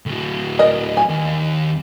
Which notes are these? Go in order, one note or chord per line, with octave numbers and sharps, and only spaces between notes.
D2 F#3
A#4 D#5
G#5
D#2